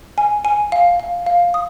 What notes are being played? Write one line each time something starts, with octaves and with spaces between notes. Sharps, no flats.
G#5
G#5
F5
F5
F5
D#6